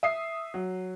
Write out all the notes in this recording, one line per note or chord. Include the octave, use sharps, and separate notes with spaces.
E5 D#6 C7
F#3